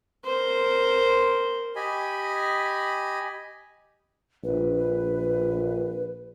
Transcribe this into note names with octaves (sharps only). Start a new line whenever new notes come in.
A#4 C5
G4 D#5 G#5 B5
A#1 B4